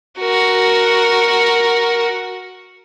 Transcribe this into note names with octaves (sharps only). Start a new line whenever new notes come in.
F#4 A#4